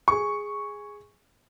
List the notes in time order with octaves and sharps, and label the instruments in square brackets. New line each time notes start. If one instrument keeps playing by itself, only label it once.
[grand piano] G#4 C#6